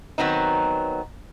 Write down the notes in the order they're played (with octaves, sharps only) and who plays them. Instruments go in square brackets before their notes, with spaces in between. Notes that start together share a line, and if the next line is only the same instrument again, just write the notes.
[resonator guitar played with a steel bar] D#3 F#3 B3 C4 D#4